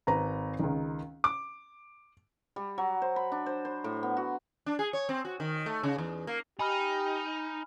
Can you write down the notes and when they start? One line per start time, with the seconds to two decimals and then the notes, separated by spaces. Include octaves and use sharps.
0.07 G#1 B4 A#5
0.59 C#2 D#3
1.24 D6
2.56 G3
2.78 F#3
3.02 C5
3.16 B5
3.32 D4
3.46 C5
3.65 C5
3.84 A2
4.03 B3
4.17 F#4
4.66 D4
4.79 G#4
4.93 C#5
5.09 C4
5.25 F#4
5.40 D#3
5.66 A3
5.83 C#3
5.98 E2
6.27 A#3
6.59 D#4 G4 G#5 B5 F6